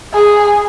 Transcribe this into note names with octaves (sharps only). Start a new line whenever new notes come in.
G#4